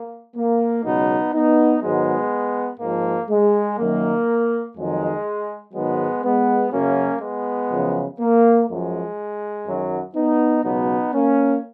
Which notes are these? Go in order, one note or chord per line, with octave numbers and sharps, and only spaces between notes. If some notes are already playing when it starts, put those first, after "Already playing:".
Already playing: A#3
A#3
C#2 B2 F#3 B3 D#4
B3 D#4
G#2 D#3 F#3 G#3 B3
G#2 F3 A#3
G#3
F#2 D#3 F#3 A#3
F2 D#3 F#3 G#3
G#2 D#3 F#3 G#3 B3
G#3 B3
F#2 C#3 F#3 A#3 C#4
G#3 B3
F#2 C#3 F3
A#3
F#2 F3 G#3
F#2 D#3 F#3
B3 D#4
C#2 B2 F#3 B3 D#4
A#3 C#4